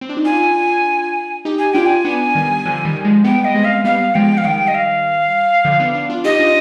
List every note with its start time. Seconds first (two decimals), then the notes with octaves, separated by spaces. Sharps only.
0.01 C4
0.09 D4
0.17 D#4
0.25 D4 F4 G#5
1.45 D#4 G4
1.59 G#5
1.73 D4 F4 G5
1.86 G#5
2.05 B3 D4
2.35 D#3 G3
2.65 D3 F3
2.85 D#3 G3
3.04 F3 G#3
3.24 G3 B3 G5
3.45 B3 D#5
3.55 G#3 C4
3.65 F5
3.84 G3 B3 F5
4.15 F3 G#3 G5
4.38 F5
4.44 D#3 G3 G5
4.68 D#5
4.75 F5
5.65 D3 F3
5.80 B3 D4
5.94 B3 D4
6.09 D4 F4
6.24 D#4 G4 D#5
6.39 D4 F4